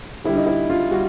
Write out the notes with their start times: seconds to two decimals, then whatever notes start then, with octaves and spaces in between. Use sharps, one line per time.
0.24 D3 G3 E4
0.36 D#4
0.46 E4
0.70 F4
0.91 G3 F#4